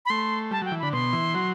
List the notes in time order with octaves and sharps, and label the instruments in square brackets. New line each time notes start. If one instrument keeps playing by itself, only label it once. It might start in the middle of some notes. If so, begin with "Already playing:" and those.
[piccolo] B5
[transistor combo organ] A3 [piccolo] C6
[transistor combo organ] G3 [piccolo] A5
[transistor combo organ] F#3 [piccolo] G5
[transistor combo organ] E3
[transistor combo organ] D3 [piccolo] B5
[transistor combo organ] B2 [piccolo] C6
[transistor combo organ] E3
F#3